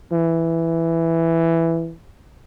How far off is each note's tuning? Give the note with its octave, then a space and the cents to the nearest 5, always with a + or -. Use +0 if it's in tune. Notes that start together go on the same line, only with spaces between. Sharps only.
E3 +5